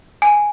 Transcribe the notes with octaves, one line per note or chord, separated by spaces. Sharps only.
G#5